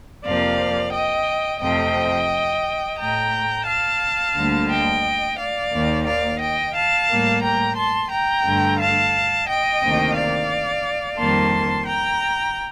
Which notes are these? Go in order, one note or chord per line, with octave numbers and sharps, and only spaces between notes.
F2 C3 F3 A#3 D5 F5
D#5 G5
F2 C3 F3 A3 D#5 G5
A2 A3 G5 A#5
F5 A5
D2 D3 G3 A#3
D#5 G5
D5 F5
D#2 D#3 A#3
D5 F5
D#5 G5
F5 A5
A2 G3 A#3
G5 A#5
A5 C6
G5 A#5
G2 D3 A3
F5 A5
D#5 G5
D2 C3 D#3 A#3
D5 F5
F2 D#3 G3 A#3 A5 C6
G5 A#5